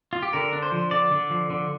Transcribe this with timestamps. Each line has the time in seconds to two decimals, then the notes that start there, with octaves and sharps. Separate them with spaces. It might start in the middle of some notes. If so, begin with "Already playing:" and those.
0.13 F4
0.23 G4
0.33 D3 A#4
0.53 D4
0.63 C5
0.72 F3
0.91 D3 D5
1.11 D3
1.30 F3
1.50 D3